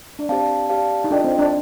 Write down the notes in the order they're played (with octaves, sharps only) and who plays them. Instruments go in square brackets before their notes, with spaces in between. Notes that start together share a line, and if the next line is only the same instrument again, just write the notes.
[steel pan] D4
[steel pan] C4 [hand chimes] G4 D5 F5 A5
[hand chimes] G4 D5 F5 A5
[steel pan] D#4
[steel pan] D4 [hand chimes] F4 A4 D#5 G5
[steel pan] C4
D4